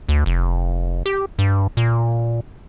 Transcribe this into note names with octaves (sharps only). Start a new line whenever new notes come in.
D2
F1
G4
G2
A#2